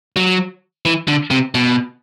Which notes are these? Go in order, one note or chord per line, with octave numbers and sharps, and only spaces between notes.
F#3
E3
D3
C3
B2